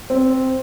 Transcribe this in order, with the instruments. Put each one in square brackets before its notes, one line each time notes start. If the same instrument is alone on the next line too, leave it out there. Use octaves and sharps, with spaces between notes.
[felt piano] C4